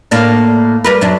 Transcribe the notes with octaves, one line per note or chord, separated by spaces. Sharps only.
A2 A#3 D4
G3 A#4 B4
F#2 F#3 D4